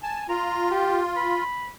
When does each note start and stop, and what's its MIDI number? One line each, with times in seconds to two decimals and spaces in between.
0.03 0.28 80
0.03 0.24 81
0.29 1.44 65
0.29 0.67 82
0.71 0.99 67
1.16 1.70 83